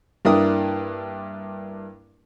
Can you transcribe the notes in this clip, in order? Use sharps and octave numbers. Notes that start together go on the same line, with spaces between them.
G2 A#3 D4 E4 A#4 D#6